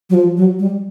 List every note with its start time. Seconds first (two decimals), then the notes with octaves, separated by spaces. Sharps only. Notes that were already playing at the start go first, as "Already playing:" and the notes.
0.10 F#3
0.14 F3
0.37 F#3
0.59 G3